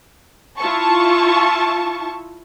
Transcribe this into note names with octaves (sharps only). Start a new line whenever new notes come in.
E4 F4 A5 C#6